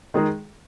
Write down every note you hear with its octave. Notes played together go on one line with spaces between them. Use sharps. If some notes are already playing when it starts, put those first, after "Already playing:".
D#3 G#3 D#4 G#4